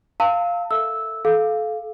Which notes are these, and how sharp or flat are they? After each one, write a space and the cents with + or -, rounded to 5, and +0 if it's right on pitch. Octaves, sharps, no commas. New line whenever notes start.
F5 +0 A5 +40 E6 -25
A4 +15 E5 -5 E6 -10
A4 -30 F5 +0